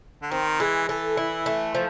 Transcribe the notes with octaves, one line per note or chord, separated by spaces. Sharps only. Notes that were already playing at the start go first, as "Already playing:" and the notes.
D3
D#3 C4
E3 G#3
E3 A4
E4
A3
F3